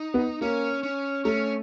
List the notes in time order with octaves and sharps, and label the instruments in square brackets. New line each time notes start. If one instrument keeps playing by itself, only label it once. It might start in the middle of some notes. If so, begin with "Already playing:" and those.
Already playing: [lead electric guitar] D#4
[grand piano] B3
[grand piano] A#3 [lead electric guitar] C#4
[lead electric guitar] C#4
[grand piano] A3 [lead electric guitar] C#4